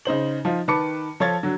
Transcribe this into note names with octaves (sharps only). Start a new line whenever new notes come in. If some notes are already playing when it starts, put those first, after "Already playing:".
C#3 D#4 C5 F#7
F3 D#4 F4
D#3 B4 A5 B5 D6 C#7
F3 A4 C#5 F5 G#6 A6
D3 F#3